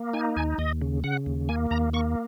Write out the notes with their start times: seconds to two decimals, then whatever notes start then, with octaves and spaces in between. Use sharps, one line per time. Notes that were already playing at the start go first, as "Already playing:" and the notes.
Already playing: A#3
0.13 D#4 G#5
0.36 D#2 G#5
0.58 D#2 D#5
0.82 C#3
1.04 C#3 F#5
1.26 D#2
1.49 A#3 G#5
1.71 D#2 A#5
1.93 A#3 C#6